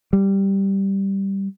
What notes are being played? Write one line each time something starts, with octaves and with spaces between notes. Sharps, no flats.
G3